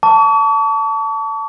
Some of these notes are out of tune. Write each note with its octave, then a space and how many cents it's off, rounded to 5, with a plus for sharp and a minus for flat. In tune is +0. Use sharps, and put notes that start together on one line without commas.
A5 +10 C#6 +45